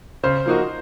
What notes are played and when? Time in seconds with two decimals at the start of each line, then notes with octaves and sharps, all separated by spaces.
0.23 C#3 C5
0.46 F3 A#3 D#4 F#4